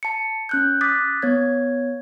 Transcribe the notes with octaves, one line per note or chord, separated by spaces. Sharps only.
A5 C#7
C#4 F#6 G6
D6 D#6 F#6 A6 B6
B3 C#5 G#6